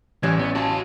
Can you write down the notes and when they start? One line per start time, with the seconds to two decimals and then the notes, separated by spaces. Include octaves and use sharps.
0.23 A1 E3 G3 G#3 C#4 C#5 G#6
0.39 B3
0.55 F#4 F5 G#5 A5